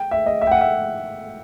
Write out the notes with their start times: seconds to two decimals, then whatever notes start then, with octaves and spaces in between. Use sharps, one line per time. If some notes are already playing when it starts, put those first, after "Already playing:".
Already playing: G5
0.11 E5
0.26 D#5
0.41 E5
0.47 G5
0.51 F#5
0.61 E5